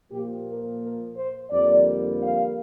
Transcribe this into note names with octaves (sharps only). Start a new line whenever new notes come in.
A#2 F3 A#3 G4
A#4
A#4
C5
F2 D3 G3 A#3 D5
F5